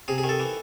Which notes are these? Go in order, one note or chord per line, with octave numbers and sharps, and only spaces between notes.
C3 G#4
G#4
D#3
A4
E3